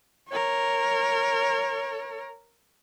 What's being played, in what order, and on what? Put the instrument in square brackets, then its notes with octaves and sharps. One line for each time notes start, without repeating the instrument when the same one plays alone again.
[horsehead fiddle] A#4 C#5